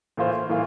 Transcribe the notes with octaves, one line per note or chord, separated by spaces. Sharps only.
A2 E3 A#3 F4 C5
A2 E3 A#3 F4